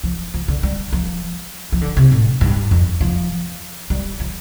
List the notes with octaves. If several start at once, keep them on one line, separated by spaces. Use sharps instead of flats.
F3
F3
D3
G3
F3
F3
D3
C3
A2
G2
F2
F3
G3
F3